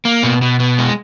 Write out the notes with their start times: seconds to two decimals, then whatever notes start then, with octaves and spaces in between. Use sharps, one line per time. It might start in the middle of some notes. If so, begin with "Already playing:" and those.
0.05 A#3
0.23 B2
0.42 B2
0.60 B2
0.78 G#3